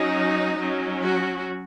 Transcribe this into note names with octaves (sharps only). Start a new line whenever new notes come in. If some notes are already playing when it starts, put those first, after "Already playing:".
Already playing: F#3 C#4 D#4
F#3 C#4
F#4